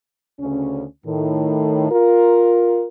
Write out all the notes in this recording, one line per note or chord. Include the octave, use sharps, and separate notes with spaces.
D2 C#3 C#4
A2 D#3
F4 A#4